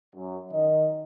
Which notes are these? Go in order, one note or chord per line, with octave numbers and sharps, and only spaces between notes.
F#2
D#3 D#5